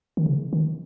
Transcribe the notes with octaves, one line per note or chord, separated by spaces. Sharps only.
D#3
C#3
D#3